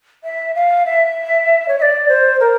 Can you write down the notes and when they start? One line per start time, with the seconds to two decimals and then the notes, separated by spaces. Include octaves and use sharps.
0.24 E5
0.55 F5
0.85 E5
1.68 C#5
1.78 E5
1.82 D5
2.08 C5
2.40 A#4